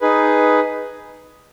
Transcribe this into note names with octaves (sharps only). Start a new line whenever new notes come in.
D#4 G#4 B4